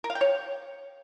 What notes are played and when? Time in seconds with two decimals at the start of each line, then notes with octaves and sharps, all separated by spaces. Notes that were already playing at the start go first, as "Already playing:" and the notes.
0.04 A#4
0.10 F5
0.15 G5
0.21 C#5